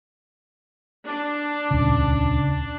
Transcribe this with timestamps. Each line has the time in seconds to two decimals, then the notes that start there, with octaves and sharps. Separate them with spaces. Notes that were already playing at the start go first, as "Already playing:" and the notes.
1.07 D4
1.71 D#1 C#2 C#3